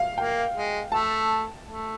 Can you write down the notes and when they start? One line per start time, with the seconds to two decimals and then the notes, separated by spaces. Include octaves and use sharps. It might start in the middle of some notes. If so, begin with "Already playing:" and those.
Already playing: F5
0.18 A#3 G5
0.55 G#3
0.92 A3 A5
1.66 A3